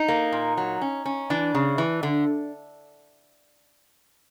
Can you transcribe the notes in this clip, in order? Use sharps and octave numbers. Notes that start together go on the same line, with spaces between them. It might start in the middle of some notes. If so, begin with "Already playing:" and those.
Already playing: D#4
A#3
A#2
F#3
C#4
C#4
E3 D4
C#3
E3
D3